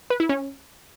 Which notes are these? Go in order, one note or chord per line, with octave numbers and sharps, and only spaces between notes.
B4
E4
C#4